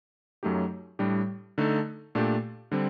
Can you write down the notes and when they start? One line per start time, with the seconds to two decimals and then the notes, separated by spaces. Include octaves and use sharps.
0.43 F#2 F#3 A3 D#4 G4
0.99 A2 G3 D4 G4
1.58 D3 A3 D#4 A4
2.15 A#2 A3 D4 G4
2.72 D3 G3 C4